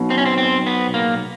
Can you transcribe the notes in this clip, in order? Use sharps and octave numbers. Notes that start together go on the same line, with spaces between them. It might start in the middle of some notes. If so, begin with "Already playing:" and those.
Already playing: B1 B2
C4
C#4
C4
C4
B3
A#3